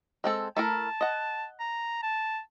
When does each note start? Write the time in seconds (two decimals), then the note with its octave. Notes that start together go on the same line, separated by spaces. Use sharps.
0.24 G#3 C4 A4
0.57 A3 E4 A#4 A5
1.01 D#5 F#5
1.60 A#5
2.03 A5